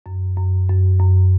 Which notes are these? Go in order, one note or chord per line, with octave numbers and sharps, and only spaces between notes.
F#2
F#2
F#2
F#2